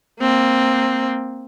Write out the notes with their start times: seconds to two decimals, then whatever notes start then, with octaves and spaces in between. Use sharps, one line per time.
0.20 A#3 C4